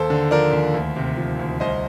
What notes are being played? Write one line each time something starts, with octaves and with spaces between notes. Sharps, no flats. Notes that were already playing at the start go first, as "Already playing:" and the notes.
Already playing: D#2 A4 C5
D3
F3 A#4 D5
D#2
D2
C3
F3
D2
C2 C5 D#5